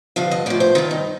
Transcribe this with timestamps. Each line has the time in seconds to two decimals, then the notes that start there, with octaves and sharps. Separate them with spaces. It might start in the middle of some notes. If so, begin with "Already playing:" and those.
0.16 G2 D3 F3 F5
0.31 D#5
0.46 A2 F3 D5
0.60 C5
0.75 G2 D#3 F4
0.91 D#4